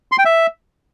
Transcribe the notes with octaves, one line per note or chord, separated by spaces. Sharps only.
C6
G5
E5